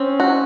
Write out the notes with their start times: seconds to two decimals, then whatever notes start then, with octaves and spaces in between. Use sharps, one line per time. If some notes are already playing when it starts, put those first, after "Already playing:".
Already playing: C4 C#4
0.20 F#4